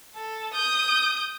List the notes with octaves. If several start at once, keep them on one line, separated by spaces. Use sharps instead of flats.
A4
D#6 G6